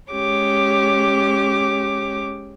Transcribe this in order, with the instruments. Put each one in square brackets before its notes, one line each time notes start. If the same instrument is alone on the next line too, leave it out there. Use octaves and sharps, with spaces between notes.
[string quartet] G#3 C#4 G4 C#5 D6